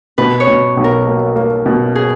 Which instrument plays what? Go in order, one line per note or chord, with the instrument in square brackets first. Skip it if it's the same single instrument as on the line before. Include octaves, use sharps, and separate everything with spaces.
[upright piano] B2 [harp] B4
[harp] C#5
[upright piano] B2
B1
[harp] A#4
[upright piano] A#3
A#3
B2
[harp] G#4